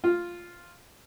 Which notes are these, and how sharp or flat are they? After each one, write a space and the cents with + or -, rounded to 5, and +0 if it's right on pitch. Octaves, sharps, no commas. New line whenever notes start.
F4 +0